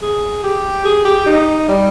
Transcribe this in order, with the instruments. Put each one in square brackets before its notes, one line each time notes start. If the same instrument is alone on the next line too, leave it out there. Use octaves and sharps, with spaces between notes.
[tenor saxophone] G#4
G4
G#4
G4
D#4
G3